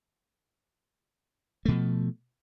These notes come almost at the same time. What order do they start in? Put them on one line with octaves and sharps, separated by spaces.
A3 B2 F3